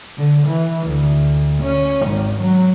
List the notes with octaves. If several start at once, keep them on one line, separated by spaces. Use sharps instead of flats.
D3
E3
D2
C#4
G#1
F#3